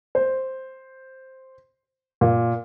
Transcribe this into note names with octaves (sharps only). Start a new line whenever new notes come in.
C5
A#2